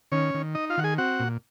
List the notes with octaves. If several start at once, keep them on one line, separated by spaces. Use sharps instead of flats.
D#3 C#4 C#5
D#3
D#4 D#5
F4 F5
D#3 F#5
G#4 G#5
C4 F#4 F#5
A#2